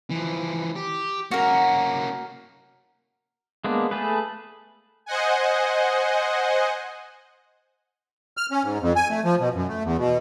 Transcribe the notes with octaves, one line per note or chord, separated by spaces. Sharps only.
E3 F3
G4
A#3 C#4 F#4 A#4
G#3 A#3 B3 D4
A3 G#4 A4 B4
C5 D#5 F#5 G#5
F6
C#4
G#2
F2
G#5
A3
F3
B2
F#2
A3
E2
B2